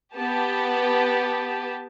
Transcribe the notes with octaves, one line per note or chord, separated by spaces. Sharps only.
B3 G4 A5